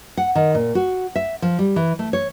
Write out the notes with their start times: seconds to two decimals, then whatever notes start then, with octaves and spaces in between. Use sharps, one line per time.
0.17 F#5
0.35 D#3
0.55 A#2
0.75 F#4
1.16 E5
1.42 F3
1.59 G3
1.76 E3
1.99 A3
2.13 C#5